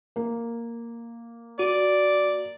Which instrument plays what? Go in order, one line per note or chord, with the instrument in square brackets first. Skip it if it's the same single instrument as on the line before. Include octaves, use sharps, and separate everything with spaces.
[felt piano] A#3
[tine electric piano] F#4 [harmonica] D5